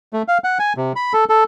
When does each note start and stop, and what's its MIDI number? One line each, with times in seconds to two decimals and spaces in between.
0.13 0.22 57
0.28 0.38 77
0.44 0.58 78
0.59 0.73 80
0.77 0.93 48
0.96 1.13 83
1.13 1.24 69
1.29 1.44 69